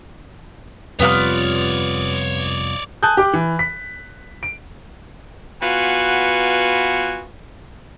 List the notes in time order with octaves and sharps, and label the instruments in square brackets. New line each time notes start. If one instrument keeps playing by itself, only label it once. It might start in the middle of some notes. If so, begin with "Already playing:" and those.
[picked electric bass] F2 C3 G3 [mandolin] B3 F4 F6 [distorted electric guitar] C#5 D5
[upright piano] G#5 A5 D#6 F#6 G6
G4 D6
E3
B6
D7
[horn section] B3 F4 F#4 B4 F#5 G#5